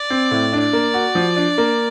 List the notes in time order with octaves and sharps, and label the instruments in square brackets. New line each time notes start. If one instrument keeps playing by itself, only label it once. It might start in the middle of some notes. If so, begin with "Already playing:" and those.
Already playing: [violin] D5
[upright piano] C4
A2
D4
A#3
F#4
F3
D4
A#3